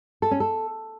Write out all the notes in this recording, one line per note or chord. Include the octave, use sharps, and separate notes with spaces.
A4
C#4
A4